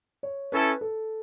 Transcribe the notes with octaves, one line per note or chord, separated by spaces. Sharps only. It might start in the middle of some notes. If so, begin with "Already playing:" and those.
C#5
C#4 E4 A4 B4
A4